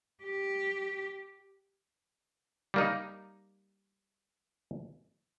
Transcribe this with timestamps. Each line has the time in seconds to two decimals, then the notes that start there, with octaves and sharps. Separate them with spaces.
0.24 G4
2.74 G3 A#3 D#4